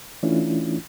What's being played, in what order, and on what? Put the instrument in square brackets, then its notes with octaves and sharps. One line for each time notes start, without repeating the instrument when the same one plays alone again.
[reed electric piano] E3 A3 C#4 D4 E4 F4